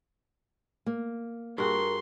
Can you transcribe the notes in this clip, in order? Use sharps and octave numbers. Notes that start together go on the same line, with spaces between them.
A#3
G2 F#4 G#4 A#4 C6